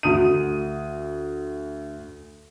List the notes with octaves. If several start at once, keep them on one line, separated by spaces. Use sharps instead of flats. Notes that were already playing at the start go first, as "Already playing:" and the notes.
D2 D#6 D#7